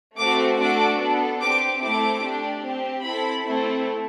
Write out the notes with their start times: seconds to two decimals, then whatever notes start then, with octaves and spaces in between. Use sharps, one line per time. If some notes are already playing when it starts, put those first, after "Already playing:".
0.18 A3 C4 F#4 D6
0.59 A3 D4 F#4 A4 D6
1.00 B3 D4 A4
1.41 C4 G4 D6
1.82 A3 C4 E4 D6
2.23 D4 G4
2.64 C4 G4
3.05 C4 E4 A4 B5
3.46 A3 C4 E4 A4